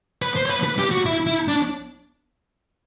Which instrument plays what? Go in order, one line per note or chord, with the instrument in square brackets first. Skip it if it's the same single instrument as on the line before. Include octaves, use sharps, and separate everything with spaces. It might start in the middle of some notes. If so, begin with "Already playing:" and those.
[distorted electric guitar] B4
C5
B4
B4
G4
F#4
E4
E4
D4